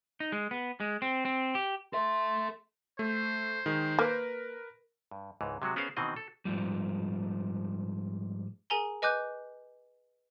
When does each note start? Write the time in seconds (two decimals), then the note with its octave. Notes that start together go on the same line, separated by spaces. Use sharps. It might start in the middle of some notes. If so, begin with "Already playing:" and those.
0.20 D#4
0.32 G#3
0.51 B3
0.80 G#3
1.02 C4
1.25 C4
1.55 G4
1.93 A4 E5 C6
2.99 A3 C5
3.66 D#3 G#3
3.99 A#3 A#4 B4
5.11 G2
5.41 C#2 G#2 E3
5.62 C3 F#3 G#3 F#4
5.76 B3 C#4 G#4 A#4 C5 F5
5.97 B2 D#3 E3 C4 D#5
6.16 A4
6.45 G#2 C3 F3 G3
8.70 G#4 A#4 G#5 A#5 G7
9.02 B4 D#5 G#5 D6 F#6 G6